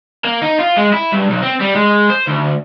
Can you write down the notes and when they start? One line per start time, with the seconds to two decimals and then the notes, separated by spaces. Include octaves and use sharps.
0.25 A#3
0.42 D#4
0.59 F4
0.77 G#3
0.93 E4
1.13 G2
1.30 B1
1.43 C4
1.61 G3
1.76 G#3
2.10 C5
2.28 D2